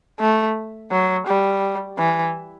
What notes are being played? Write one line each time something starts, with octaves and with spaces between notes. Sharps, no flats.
A3
F#3
G3
E3